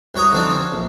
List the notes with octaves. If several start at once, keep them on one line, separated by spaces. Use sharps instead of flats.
C2 F#3 C#5 A#5 D#6
D3 F3 C4 D4 D#4
C#4
A#1